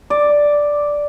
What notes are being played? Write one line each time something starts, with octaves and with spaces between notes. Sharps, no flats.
D5